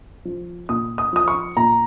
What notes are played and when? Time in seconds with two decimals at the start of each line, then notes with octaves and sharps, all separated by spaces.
0.25 F3
0.69 A#2 D#6
0.98 D#6
1.13 F3 D#6
1.28 C#6
1.57 A#2 A#5